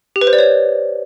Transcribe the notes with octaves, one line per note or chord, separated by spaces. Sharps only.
G4
B4
C5
D5
C#5